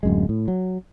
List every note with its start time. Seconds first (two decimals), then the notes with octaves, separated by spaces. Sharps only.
0.03 D1 F#2 G#3
0.29 A2
0.48 F#3